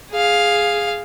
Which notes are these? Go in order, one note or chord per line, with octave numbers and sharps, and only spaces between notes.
G#4 F5